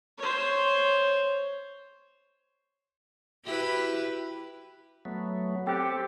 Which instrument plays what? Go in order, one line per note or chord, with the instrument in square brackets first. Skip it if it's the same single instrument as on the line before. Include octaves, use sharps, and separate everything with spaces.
[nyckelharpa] C5 C#5
[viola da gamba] E4 G4 B4 [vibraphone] F#4 E5
[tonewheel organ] F#3 A3 B3
[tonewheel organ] C4 A4 [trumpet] G4 [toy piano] C5 G5